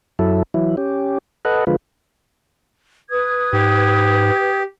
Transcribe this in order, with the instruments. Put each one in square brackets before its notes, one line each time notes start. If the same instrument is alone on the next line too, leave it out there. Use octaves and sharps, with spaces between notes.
[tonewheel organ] F#2 F#3 E4 A4
E3 F#3 E4
C#4 G4
A4 B4 D#5 F#5
D3 F3 G#3 F4 B4
[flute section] B4 D#6 G#6
[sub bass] G#2 [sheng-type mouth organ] G4